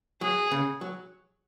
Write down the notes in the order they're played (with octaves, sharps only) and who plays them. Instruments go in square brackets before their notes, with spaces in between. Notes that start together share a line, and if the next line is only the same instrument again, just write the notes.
[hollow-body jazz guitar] F#3 [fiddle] G#4
[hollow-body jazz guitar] C#3
F#3